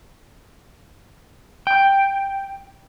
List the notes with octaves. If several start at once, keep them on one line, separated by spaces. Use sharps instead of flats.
G5